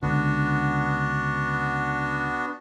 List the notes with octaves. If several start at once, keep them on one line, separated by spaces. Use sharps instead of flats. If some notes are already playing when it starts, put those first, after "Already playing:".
C#2 D3 B3 D4 F#4